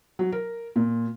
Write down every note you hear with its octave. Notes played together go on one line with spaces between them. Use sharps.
F#3
A#4
A#2